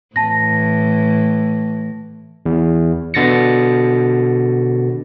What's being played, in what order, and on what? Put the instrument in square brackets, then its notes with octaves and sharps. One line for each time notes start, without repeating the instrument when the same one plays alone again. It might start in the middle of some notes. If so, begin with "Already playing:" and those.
[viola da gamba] A2 E3 [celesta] A5 A#6
[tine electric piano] E2
B2 D3 A6 A#6 C#7